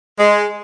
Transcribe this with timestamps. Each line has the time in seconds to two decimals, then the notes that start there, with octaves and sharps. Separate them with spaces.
0.18 G#3